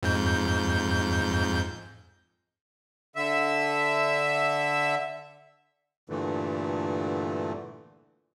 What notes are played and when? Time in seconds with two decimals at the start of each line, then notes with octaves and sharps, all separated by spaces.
0.03 F2 G#2 G6
3.16 D3 E5
6.10 G2 A#2 D3 E3 A3